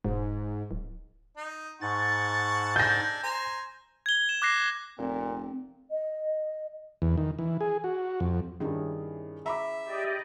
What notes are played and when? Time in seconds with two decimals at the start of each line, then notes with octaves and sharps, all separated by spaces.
0.04 E1 G#2
0.71 D1
1.37 D#4
1.81 G#2 F#5 A5 C#6 A6
2.76 D4 A4 G#5 G6 A#6
3.23 C5 G#5 A#5
4.06 G#6 G7
4.29 E7
4.42 D6 F#6 A#6 C7
4.98 F1 A#2 C4
5.90 D#5
7.02 E2
7.17 D#3
7.39 E3
7.61 G#4
7.84 F#4
8.20 F2
8.60 G2 D#3 C#4 E4 G#4
9.46 E5 A#5 B5 D6
9.85 G4 D5 D#5